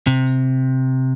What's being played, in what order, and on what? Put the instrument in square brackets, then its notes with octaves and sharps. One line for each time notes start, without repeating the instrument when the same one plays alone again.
[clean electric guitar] C3